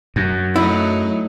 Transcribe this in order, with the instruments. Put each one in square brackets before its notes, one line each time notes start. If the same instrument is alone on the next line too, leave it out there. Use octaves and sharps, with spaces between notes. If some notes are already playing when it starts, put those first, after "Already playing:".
[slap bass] F#2
[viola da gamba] F#3 A3 D#4 [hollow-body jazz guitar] E4